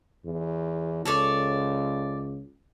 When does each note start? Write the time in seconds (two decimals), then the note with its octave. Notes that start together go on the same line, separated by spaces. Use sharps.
0.25 E2
1.05 C#2 A4 C#5 D5